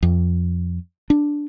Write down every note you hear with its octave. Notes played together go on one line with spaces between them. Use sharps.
F2
D4